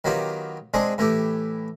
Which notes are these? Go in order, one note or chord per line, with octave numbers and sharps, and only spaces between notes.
D#3 F#3 B3 F4 G4
G#3 C4 D4 G#4
A2 E3 A3 G4